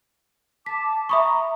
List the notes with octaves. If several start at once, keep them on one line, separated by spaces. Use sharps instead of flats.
A5 D6 B6
E5 A#5 B5 C#6 D#6